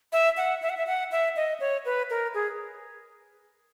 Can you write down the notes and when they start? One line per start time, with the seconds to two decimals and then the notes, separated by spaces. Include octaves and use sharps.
0.13 E5
0.37 F#5
0.62 E5
0.70 F#5
0.77 E5
0.87 F#5
1.12 E5
1.36 D#5
1.60 C#5
1.85 B4
2.10 A#4
2.34 G#4